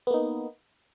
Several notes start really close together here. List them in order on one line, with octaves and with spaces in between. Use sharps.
B3 A#3 D#4